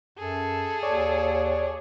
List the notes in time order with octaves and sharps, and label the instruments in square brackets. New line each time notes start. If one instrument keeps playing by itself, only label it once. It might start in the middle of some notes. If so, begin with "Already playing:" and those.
[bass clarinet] F#2 [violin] G#4 A4
[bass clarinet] D#2 [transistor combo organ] C#5 D5